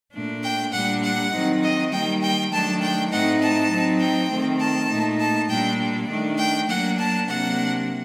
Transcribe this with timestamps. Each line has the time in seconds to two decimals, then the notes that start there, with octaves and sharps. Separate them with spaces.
0.13 A#2 A3 D4
0.43 G5
0.72 A#2 G3 D4 F#5
1.02 F#5
1.33 D#3 F#3 C4 D#4
1.63 D#5
1.91 D#3 G3 A#3 G5
2.22 G5
2.51 D#3 F#3 A3 D4 A5
2.81 G5
3.11 A2 A3 C4 D#4 F#5
3.41 A5
3.71 F#3 C4 D#4
4.00 G5
4.30 D#3 A3 C4
4.60 A5
4.89 A#2 A3 D#4
5.19 A5
5.49 A#2 G3 D4 G5
6.09 D#3 A3 D4
6.38 G5
6.68 F#3 A#3 D4 F#5
6.98 A5
7.27 C3 F#3 A#3 D4 F#5